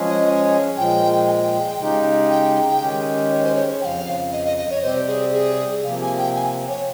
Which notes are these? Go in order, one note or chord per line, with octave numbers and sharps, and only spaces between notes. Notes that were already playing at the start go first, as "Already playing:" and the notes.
Already playing: F3 G#3 C#4 G#4
D#5
D#5
C#5
A#2 F3 G#3 G5
G#5
G5
C#3 G#3 D#4 G4
G5
D#3 G#3 C#4 G4
C#5
C5
C#5
C#5
F2 C#3 F3 F5 G5
D#5
D#5
D#5
C#5
C3 G3 C4 G4 C5
G#4
G#4
C3 F3 A#3 F5
G#5
G5
G#5
C#5